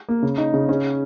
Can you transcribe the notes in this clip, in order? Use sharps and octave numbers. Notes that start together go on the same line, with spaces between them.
A#3
C#3
D#4
C#3
C#4